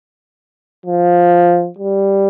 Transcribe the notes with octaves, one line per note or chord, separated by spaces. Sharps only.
F3
G3